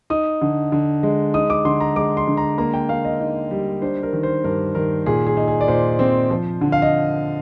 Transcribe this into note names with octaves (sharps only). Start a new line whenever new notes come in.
D#4 D#6
D3
D3
G#3
D#4 D#6
D6
D3 C6
A#5
G#3 D6
C6
D3
A#5
A#3 A#5
G5
A#3 F5
D#5
D#4
G3
D4 C5
A#4
D#3
C5
G2 A#4
D#3 A#4
A#2 G#4
G#4
D#4
G#4
D5
A#2 C5
C4
F3
D3
F5
D#5